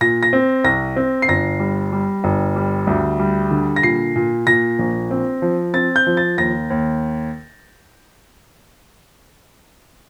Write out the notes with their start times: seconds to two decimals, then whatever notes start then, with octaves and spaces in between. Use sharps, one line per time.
0.01 A#2 A#6
0.23 A#6
0.33 C4
0.64 C2 A#6
0.96 C4
1.22 C7
1.28 G1 A#6
1.60 G3
1.92 G3
2.24 G1
2.56 G3
2.87 D2
3.19 G3
3.51 D3
3.76 A#6
3.83 A#2 C7
4.16 A#2
4.47 A#2 A#6
4.79 A#1
5.11 C4
5.42 F3
5.74 C4 A6
5.96 G6
6.06 F3
6.17 A6
6.37 D#2 A#6
6.70 D#2